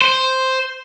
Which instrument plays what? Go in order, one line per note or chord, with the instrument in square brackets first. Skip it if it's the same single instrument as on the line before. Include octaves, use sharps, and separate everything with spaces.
[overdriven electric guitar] C5